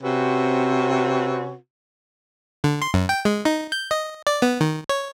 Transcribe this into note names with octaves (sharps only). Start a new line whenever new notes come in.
C3 C4 C#4 F#4 B4
D3
C6
F#2
G5
G#3
D#4
G6
D#5
D5
B3
D#3
C#5